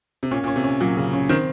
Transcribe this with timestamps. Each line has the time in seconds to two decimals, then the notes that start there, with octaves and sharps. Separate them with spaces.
0.23 C3
0.31 A#2 C#4
0.44 A#2
0.48 C#4
0.56 C3
0.64 C#4
0.81 A#2 F#3
0.97 C#3
1.13 C#4
1.29 D#3 C4